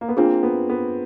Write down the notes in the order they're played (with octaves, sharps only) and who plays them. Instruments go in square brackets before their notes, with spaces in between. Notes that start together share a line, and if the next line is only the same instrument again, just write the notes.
[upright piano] A#3
B3
[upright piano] A#3 C4 [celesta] D4 F4 G#4
[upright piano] B3
B3